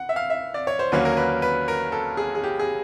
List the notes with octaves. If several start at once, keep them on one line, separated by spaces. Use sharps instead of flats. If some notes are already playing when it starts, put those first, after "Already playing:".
Already playing: F#5
E5
F5
E5
D5
C#5
C5
D#2 D3 F#3 A#3 C#4 B4
A#4
B4
B4
A#4
A4
G#4
G#4
G4
G#4